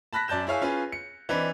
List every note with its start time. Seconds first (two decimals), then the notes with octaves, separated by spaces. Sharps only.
0.13 A5 B5 F#6 A#6 B6
0.28 F#2 D5 A5 G6 E7
0.47 E4 G#4 C#5 F5 G#5
0.62 C#4 F4 G#4 B4 G#5
0.92 C#7
1.29 E3 C4 D4 D#4 B4